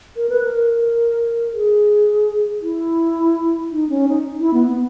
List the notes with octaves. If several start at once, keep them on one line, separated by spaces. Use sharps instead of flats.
A#4
B4
A#4
G#4
E4
D#4
C#4
D#4
E4
B3
B3